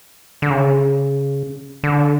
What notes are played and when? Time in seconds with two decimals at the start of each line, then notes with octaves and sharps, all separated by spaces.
0.42 D3
0.50 C#3
1.84 D3